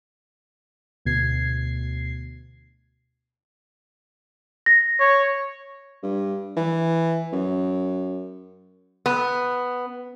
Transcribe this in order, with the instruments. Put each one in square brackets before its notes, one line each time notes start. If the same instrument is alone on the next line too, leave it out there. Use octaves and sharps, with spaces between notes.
[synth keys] D2 B2 G#6 C7
[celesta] A#6
[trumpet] C#5
[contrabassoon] G2
E3
F#2
[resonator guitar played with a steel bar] B3